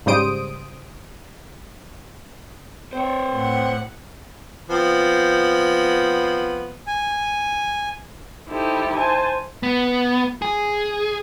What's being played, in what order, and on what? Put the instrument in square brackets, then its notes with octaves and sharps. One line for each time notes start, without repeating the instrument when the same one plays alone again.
[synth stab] G#2 C#3 G3 C5 D#6 D7
[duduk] C4 [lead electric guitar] C5 C#5
[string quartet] A2 F#5
[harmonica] F3 B3 C4
[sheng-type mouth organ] G#5
[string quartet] D#4 E4 G4 A4 C5
C5 G#5 A5
[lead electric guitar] B3
G#4